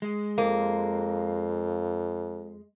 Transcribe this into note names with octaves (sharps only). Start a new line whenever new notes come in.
G#3
F2 A#3